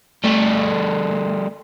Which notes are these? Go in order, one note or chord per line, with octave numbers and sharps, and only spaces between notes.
G3 A3